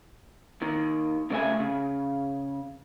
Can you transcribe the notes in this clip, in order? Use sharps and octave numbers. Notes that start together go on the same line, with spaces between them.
D#2 D#3
C#3 A3 D5 E5 G#5
C#3